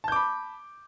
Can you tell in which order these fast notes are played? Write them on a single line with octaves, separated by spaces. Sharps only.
A5 G6 D6 B5